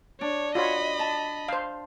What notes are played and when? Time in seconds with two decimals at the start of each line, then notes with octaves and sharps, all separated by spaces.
0.21 D4 C#5
0.55 F4 F#4 C#5 D#5 B5
0.99 A5
1.48 C5 F5